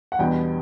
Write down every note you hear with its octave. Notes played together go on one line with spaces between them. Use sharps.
F#5
E2 B2 G3 B3 D4 G5